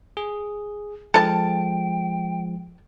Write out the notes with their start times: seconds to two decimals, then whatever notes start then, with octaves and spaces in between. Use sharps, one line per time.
0.17 G#4
1.14 F3 G#3 A4 G5 A5